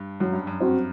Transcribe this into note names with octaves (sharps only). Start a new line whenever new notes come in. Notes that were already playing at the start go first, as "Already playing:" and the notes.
Already playing: G2
F#2 F#3
G2
F#2
C4 F#4 C5